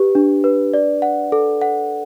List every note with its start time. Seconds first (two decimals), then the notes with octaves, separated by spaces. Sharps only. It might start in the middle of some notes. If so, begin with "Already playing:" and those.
Already playing: G4 B4
0.15 D4
0.44 B4
0.74 D5
1.02 F#5
1.32 A4
1.61 F#5